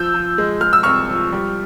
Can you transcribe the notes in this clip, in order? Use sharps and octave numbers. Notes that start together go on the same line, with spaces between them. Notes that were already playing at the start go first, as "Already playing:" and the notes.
Already playing: F3 E6 G6
F3
G#3
G#3 F6
E6
C2 C#6 F6
F3
G3